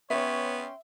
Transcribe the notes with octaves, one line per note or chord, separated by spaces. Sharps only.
B3 C#4 C#5 E5 G5 C6